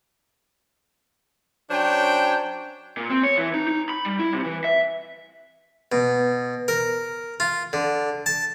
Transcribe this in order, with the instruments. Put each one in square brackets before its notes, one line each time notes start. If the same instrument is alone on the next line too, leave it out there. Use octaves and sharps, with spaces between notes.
[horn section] F#3 C#4 D4 C5 C#5 G5
[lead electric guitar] A#2
C4
C#5
E3
D#4
D#4
B5
G3
E4
C3
E3
E5
[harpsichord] B2
A#4
F4
D3
A5